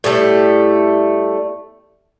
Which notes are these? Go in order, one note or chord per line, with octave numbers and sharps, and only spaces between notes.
A2 G3 A3 D5